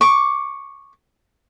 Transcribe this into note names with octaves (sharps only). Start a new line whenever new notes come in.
C#6 D6